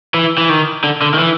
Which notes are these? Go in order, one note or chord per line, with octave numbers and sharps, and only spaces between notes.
E3
E3
D#3
D3
D3
D#3
E3